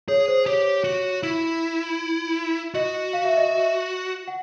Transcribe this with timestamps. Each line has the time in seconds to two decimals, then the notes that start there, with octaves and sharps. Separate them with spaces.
0.08 G#4 C#5
0.28 C5
0.46 G4 C#5
0.84 F#4
1.23 E4
2.75 F#4 D#5
3.13 F5
3.25 E5
3.37 D#5
3.49 E5
4.28 F#5